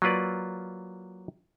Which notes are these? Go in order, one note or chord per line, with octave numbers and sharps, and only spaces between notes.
F#3 A#3 F4 B4 D5